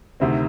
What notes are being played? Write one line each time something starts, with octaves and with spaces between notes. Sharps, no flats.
D2 C3 D#3 C4